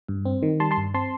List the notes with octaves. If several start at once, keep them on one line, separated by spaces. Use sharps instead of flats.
G2
C4
D#3
G3 A5 C6
A5 C6
G2
C4 A5 C6